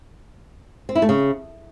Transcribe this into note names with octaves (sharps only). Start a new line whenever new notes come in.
C4
E4
A3
C#3